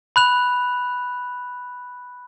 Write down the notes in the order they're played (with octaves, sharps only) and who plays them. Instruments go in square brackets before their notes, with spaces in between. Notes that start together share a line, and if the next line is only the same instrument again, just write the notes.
[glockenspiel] B5 F#6 F7